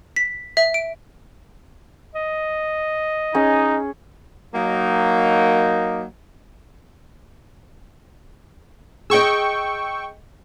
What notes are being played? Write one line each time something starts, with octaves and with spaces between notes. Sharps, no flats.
B6
E5
D7
D#5
C#4 D#4 G#4
F#3 A#3 D#4
G#4 D#5 G5 C#6 E6